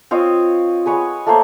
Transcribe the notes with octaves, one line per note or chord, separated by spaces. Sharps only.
C4 F4 C#5 D#5
G#4 B4 C#5 F#5
A3 A#3 C5 C#5